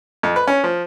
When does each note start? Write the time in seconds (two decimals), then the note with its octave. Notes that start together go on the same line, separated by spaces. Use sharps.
0.23 F2
0.36 B4
0.48 C#4
0.64 F3